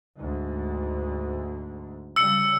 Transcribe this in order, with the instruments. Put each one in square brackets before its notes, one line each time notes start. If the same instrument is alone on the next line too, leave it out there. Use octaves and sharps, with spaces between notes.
[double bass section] D2 G#2
[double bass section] C#3 G3 [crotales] E6 C#7